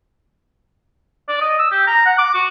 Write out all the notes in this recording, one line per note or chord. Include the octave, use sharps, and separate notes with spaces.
D5
D#5
E6
G4
A#5
F#5
D6
F#4